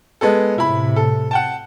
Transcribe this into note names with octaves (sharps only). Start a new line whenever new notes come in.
G#3 B3 A4
A2 C3 E4 B5
A4
F#5 G5 A5